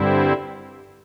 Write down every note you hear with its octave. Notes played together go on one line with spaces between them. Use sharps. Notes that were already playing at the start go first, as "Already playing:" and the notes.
Already playing: G2 D3 G3 C4 E4